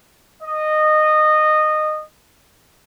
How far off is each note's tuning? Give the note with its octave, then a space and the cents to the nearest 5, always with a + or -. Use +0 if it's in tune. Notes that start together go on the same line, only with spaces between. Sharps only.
D#5 -15